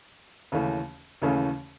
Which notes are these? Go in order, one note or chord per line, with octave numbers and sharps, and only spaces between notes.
D#2 C#3 E3 A3 C#4
D#2 C#3 E3 A3 C#4